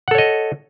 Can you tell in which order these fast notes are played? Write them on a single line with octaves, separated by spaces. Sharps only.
F#5 A4 C#5 D#5